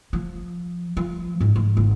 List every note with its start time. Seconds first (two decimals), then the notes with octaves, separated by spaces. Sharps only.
0.13 F3
0.97 F3
1.40 G#2 G#3
1.56 G#2
1.77 G#1